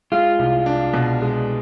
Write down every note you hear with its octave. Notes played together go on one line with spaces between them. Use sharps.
G#3 F4
C2
D4
B2
G#3